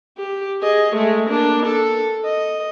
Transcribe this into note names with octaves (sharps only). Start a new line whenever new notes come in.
G4
G#4 D#5
G#3 A3
A#3 D4
A4
D#5